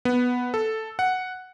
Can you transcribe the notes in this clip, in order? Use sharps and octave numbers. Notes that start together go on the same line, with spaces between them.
B3
A4
F#5